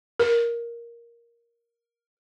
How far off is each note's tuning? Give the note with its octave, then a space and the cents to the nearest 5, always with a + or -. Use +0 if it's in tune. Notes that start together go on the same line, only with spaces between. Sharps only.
A#4 +10